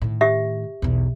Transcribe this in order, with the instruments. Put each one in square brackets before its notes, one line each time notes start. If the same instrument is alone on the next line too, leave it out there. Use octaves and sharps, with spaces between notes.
[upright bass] A2 D#3
[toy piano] G4 E5
[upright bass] B1 E2